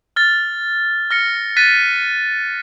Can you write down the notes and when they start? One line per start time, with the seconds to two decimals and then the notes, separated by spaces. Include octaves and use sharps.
0.16 F6 A6
1.11 F6 A#6 C#7
1.57 F#6 A6 B6 D#7